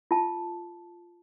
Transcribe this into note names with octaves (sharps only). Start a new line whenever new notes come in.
F4 A5